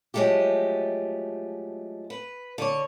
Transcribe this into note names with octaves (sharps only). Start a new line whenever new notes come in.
F3 F#3 G#3 A3 G4
B4
D3 C#5